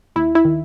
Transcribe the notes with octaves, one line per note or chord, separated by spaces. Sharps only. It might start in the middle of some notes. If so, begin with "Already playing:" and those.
D#2 E4
E4
D#3